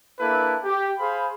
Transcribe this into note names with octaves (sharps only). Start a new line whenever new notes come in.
A#3 D4 E4 A4 B4
G4
G#4 C5 F5 B5